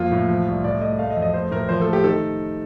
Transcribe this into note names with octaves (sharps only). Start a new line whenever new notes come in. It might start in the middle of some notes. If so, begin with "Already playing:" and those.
Already playing: F2 A#3 F4
A2
F3
C2
A2 D5
A3 D#5
A3 F5
D#5
F2
D#5
A3 C5
A2 A#4
F3 C5
A4
A3
G4
D#3 A4